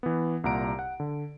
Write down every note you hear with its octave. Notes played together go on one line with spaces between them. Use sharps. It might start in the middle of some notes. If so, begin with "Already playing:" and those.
E3 B3
C2 A#2 F#5 A#5 D7
F#5
D3